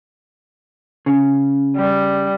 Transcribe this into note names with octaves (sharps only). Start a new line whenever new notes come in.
C#3
G3